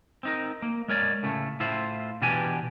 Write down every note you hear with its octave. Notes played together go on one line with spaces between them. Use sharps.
C4 D#4 A#4
A#3
G#3 A#4 C#5 D5
A2 C#3 A3
A2 E4 F4 C5
B2 E3 D4 G4 G#5